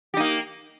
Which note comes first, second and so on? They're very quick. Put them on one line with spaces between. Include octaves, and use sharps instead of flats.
G4 D#4 A#3